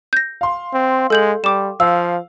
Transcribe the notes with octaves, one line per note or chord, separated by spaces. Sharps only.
G6 A#6
F5 C6
C4
G#3 A4 G6 F#7
G3 G5 D6 E7
F3 F5 E6